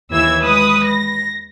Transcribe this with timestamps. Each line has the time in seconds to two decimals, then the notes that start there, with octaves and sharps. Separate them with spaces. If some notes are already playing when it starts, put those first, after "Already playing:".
0.10 D#2 E3 E6 G#6
0.41 G#3 B4 D#6
0.87 A#6